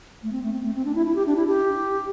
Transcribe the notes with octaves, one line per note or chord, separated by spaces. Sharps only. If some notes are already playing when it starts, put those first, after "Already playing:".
A3
C4
A3
C4
A3
C4
D4
E4
E4
G4
D4
E4
G4